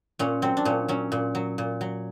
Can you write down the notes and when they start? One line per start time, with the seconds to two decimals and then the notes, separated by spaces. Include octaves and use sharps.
0.19 A#2 C#4
0.42 F#3 C4
0.57 D4
0.65 A#2 C#4
0.88 F#3 C#4
1.12 A#2
1.35 F#3
1.58 A#2
1.81 F#3